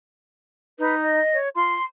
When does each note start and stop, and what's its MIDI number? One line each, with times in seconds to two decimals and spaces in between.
0.79 1.20 63
0.79 0.95 71
1.02 1.36 75
1.33 1.49 73
1.56 1.77 65
1.56 1.83 84